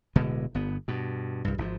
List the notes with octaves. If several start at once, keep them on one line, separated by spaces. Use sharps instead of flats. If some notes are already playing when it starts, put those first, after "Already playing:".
D1 B2 D3 G#3
G1 B3
G2 B2
C2 G2
G#1 F3